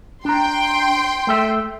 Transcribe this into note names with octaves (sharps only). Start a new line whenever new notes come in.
D4 G5 A#5 C6
A3 A4 E5